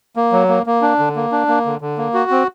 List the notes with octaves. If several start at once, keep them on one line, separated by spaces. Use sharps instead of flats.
A#3
F#3
A#3
A#3
D4
D3
A#3
D4
A#3
D3
D3
A#3
F#4
C4